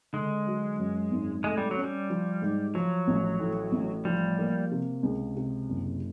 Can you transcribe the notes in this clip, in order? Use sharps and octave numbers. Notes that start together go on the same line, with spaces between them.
D3 G#3
F#3
F#2
G#1
G#3 A3
G3
F#3
C#4
G3
F3
G#2
F3 F#3
A1
A2
A1
F3 G3
A#3
C3
C#2
C3
F#1